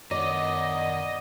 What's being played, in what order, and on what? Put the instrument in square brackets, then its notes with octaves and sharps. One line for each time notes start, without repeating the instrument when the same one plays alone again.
[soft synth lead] F#2 [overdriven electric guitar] D#3 B3 [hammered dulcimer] D5 [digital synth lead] D#5